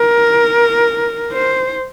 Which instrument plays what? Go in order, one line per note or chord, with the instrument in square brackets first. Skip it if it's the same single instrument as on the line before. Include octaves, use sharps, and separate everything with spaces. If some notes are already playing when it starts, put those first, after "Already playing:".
Already playing: [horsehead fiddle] A#4
C5